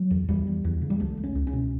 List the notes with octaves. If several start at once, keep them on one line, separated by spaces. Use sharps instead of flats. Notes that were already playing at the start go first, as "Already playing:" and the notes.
Already playing: F#3
E2
E2 G3
E2
E2
C#3
G3
C#2 A3
C#2
C#4
C#2
C#4
B2